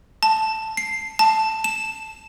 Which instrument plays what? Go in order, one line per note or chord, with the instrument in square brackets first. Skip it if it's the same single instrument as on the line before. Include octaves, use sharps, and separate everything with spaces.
[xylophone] A5
C7
A5
E7